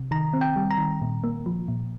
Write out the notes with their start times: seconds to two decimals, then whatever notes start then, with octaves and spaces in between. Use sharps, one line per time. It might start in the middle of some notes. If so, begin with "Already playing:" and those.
Already playing: C3
0.11 D#3 A#5
0.33 C4
0.41 G5
0.56 G3
0.71 A#5
0.78 D#3
1.02 A#2
1.24 A#3
1.46 F3
1.68 A#2